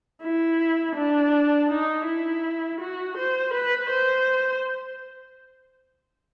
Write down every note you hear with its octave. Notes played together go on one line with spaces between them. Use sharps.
E4
D4
D#4
E4
F#4
C5
B4
C5